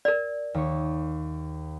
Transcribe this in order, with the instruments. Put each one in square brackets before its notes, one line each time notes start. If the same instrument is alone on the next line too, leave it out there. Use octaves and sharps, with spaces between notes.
[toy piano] A#4 D5
[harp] D#2 C#6